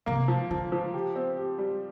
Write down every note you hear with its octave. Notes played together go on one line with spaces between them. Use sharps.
C3 A#3
F3
D3 F3
F3
G4
C4
G4
G3